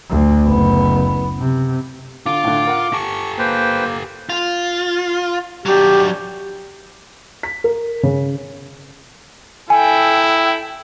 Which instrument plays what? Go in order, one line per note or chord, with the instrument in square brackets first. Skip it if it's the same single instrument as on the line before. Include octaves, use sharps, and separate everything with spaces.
[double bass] D2
F#1 B3
C3
[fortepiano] D3 [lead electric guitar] F4 [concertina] D6
[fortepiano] A2 D3
A#4 F#5
[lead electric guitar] G4 A4 [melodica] C#6
[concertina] A#3 [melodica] B4 C5 G5
[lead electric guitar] F4
[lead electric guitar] F#3 D4 [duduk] G4
[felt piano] B6
A#4
C#3
[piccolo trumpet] E4 [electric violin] A4 G5 [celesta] G#5